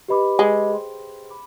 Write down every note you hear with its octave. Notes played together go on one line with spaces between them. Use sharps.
G4 B4 D#5 B5 D6
G#3
G#4 C5 G5 C6
B5 D6